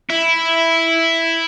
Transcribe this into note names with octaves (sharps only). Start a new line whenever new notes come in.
E4